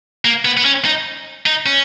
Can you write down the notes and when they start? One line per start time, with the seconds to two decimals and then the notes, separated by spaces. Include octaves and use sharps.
0.25 A#3
0.45 B3
0.57 B3
0.65 C#4
0.85 D#4
1.46 D#4
1.66 C#4